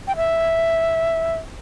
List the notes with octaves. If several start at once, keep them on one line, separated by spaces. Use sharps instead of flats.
G5
E5